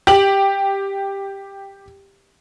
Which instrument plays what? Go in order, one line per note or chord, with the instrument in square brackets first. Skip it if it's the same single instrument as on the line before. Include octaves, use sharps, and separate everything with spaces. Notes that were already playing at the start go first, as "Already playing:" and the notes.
[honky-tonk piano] G4 F#7